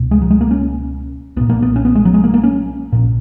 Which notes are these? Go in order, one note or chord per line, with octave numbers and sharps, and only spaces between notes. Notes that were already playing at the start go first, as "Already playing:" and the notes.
Already playing: C#2 B2
G#3
F#3
G#3
A#3
C#4
B1 A#2 B3
A#3
B3
C#4
B3
G#3
F#3
G#3
A#3
A#3
C#4
A#1 A#2